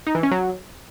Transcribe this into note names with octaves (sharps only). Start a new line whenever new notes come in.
D#4
E3
C#4
F#3